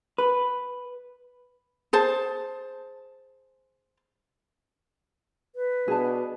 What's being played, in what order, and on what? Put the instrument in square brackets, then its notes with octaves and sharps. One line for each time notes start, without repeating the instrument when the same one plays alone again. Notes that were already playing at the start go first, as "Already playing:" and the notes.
[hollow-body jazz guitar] B4
[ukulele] G#4 C5 A5
[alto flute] B4
[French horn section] B2 D4 [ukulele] G#4 A5